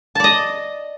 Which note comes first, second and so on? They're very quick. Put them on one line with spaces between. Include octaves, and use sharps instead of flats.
A5 D5 D#5